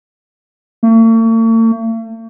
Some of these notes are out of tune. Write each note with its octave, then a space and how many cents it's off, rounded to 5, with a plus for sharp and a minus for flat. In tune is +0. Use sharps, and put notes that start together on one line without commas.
A3 +45